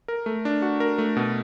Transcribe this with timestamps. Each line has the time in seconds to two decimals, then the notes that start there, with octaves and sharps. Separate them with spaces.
0.08 A#4
0.26 A3
0.45 D4
0.62 F#4
0.80 A#4
0.98 A3
1.17 B2